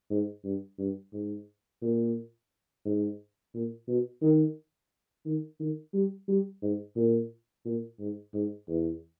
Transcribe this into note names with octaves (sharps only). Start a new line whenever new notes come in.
G#2
G2
G2
G#2
A#2
G#2
A#2
B2
D#3
D#3
D#3
G3
G3
G#2
A#2
A#2
G#2
G#2
E2